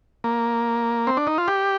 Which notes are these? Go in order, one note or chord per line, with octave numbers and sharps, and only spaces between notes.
A#3
C4
D4
D#4
F4
G4